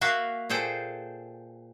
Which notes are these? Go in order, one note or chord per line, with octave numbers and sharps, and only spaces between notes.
A#3 F#4 E5 F5
A#2 G#4 A4 C5 G5